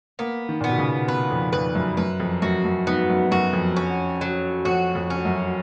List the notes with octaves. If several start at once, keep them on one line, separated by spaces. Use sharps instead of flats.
A#3 B3
D#3
A#2 B3
B2
C#3
B2 B4
F2
F2 B4
F#2
F#2 B4
F2
F#2 F#4
F#2
G#2 B3
F#2
F#2 F#4
F2
C#4
F#3
F2 F#4
F2
C#4
F#2